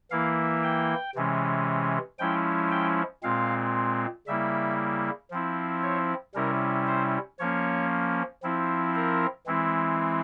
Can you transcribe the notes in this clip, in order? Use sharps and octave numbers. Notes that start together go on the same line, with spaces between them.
E3 A#3 E4 F5
G5
C3 E3 G#3 C#4
F3 G#3 C#4 E4 G5
G5
A#2 G#3 C4 F5
C#3 G3 A#3 E4 E5
F3 C4 E4
C#5
C3 G3 C#4 E4 A#4
C5
F3 A#3 C#4 C#5
F3 C4 E4
A#4
E3 G#3 C4 E4